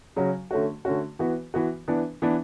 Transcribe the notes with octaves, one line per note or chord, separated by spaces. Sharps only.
C#3 F#3 C#4 F#4
D3 A3 C#4 F#4
D3 A3 C#4 F#4
E3 B3 F#4
E3 B3 F#4
E3 B3 D4
E3 B3 D4